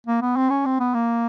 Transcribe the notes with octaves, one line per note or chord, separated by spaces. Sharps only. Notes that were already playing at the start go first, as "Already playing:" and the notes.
A#3
B3
C4
C#4
C4
B3
A#3